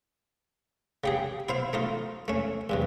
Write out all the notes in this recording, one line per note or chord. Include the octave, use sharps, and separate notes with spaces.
C#3 G4 G#4
E4 C5 F5
A3 D#4 F4
A3 C#4
E2 G2 B2